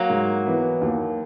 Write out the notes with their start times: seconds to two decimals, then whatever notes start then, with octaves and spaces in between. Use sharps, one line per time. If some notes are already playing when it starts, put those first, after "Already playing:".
Already playing: F#3 A#3
0.10 G#2
0.46 E3 B3
0.81 D#2